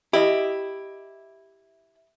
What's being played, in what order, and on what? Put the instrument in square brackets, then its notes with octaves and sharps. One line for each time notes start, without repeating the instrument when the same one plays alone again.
[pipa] E4 [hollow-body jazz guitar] G4 D#5